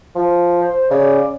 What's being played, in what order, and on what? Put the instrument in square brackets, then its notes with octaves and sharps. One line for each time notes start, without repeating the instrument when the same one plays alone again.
[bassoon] F3
[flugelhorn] C5
[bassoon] C#3 [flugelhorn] D5